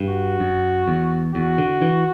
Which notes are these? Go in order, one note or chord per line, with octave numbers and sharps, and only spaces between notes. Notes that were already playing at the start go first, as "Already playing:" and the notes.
Already playing: G2
F#4
F#2
E2
E2 F#4
D3
E3